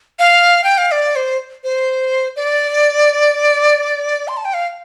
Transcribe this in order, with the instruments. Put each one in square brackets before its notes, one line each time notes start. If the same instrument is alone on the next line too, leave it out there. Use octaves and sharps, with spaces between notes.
[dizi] F5
G5
F5
D5
C5
C5
D5
C6
A5
G5
F5